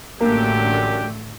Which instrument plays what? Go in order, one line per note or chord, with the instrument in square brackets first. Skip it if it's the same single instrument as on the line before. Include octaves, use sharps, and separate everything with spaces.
[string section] A1 D3 A3 [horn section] F#2 D4 G4 [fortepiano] A#3